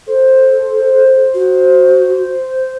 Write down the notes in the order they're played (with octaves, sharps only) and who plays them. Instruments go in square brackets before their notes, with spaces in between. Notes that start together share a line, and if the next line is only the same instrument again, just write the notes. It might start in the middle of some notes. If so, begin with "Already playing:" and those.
[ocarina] A4 [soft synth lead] C5
[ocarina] F#4